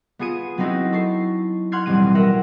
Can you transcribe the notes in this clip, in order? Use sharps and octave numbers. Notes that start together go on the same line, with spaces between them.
B3 F4 G#4 C#7 D#7
F#3 B3 C4 D#4 E4 F#4
A4 C#6 C7
F#5 C6 F6 G#6 C7
E1 A1 F#3 G3 C4 D#7
A#4 E5 F#5